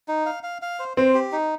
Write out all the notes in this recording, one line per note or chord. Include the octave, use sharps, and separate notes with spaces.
D#4
F5
F5
F5
C5
C4 C5
G4
D#4